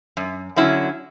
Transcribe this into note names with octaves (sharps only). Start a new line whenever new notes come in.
F#2
D3 F#3 C#4 E4